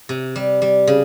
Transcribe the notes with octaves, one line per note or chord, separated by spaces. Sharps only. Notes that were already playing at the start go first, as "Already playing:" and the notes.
C3
G3
G3
C#3